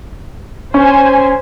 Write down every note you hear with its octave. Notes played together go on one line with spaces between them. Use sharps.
C#4 C5 G#5